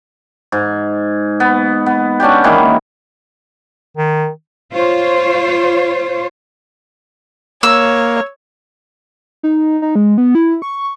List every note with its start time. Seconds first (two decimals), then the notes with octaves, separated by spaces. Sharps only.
0.52 G#2
1.40 B3
1.86 B3
2.20 C#4 D4 F#4 G4
2.44 D#3 E3 G#3 A#3
3.97 D#3
4.73 F4 C5 C#5
7.63 A#3 C#5 E6
9.43 D#4
9.82 D#4
9.95 G#3
10.18 B3
10.35 E4
10.62 C#6